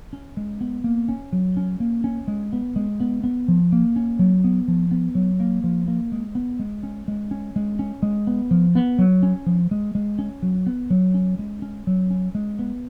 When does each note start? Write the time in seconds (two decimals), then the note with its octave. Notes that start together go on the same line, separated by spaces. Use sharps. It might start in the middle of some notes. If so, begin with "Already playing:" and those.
0.13 C#4
0.37 G#3
0.61 B3
0.84 A#3
1.09 C#4
1.33 F#3
1.57 C#4
1.80 A#3
2.04 C#4
2.28 G#3
2.53 B3
2.76 G#3
3.00 B3
3.24 B3
3.48 F3
3.72 A#3
3.96 C#4
4.19 F#3
4.44 B3
4.68 F3
4.91 B3
5.15 F#3
5.40 A#3
5.64 F3
5.88 A#3
6.12 G#3
6.35 B3
6.59 G#3
6.83 C#4
7.08 G#3
7.31 C#4
7.56 G#3
7.79 C#4
8.03 G#3
8.27 B3
8.51 F3
8.75 B3
8.99 F#3
9.23 C#4
9.46 F3
9.71 G#3
9.95 G#3
10.19 C#4
10.42 F#3
10.66 B3
10.90 F#3
11.14 C#4
11.39 G#3
11.62 C#4
11.87 F#3
12.10 C#4
12.35 G#3
12.59 B3